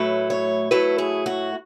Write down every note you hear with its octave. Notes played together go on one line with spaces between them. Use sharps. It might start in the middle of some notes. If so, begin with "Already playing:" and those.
Already playing: A2 F#3 A3 E4 B4
C#5
A2 F#3 A3 E4 B4
G#4
F#4